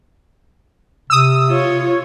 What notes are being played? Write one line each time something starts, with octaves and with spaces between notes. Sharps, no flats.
C3 D#6 E6
F4 C#5